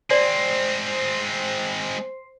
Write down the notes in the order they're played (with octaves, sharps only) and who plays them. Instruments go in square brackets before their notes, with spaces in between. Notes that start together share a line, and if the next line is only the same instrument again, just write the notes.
[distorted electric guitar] G#3 C4 [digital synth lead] C5 [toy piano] D5